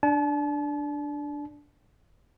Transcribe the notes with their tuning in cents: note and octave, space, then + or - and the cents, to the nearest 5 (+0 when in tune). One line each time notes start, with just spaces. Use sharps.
D4 +0 A5 -40